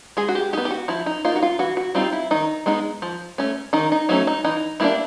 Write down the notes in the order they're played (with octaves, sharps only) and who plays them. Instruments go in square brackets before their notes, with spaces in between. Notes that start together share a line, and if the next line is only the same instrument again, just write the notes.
[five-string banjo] G#3 G#4
F#4
G4
B3 D#4 G4
G4
F#4
F3 E4
D#4
A#3 D#4 F4
F#4
F4
E3 F#4
F#4
G3 C4 D#4 F4
E4
D#3 D#4
G#3 B3 D#4
F3
A3 C#4
D#3 D#4
D#4
F#3 A3 C#4 D#4
D#4
E3 D#4
G3 A#3 D4 E4